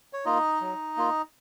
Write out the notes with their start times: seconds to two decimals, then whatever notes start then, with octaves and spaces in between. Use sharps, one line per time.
0.13 C#5
0.25 A#3 D#4 F4 D#5
0.61 F#3
0.97 A#3 F4